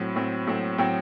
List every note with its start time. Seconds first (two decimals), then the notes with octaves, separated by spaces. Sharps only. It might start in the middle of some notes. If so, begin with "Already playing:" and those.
Already playing: A2 F#3 C4
0.16 A2 F#3 C4
0.47 A2 F#3 C4
0.78 A2 F#3 C4 G5